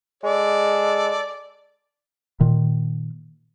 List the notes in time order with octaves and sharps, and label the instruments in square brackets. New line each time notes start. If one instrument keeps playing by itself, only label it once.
[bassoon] G#3 [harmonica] A4 D5
[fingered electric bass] A#2 D#3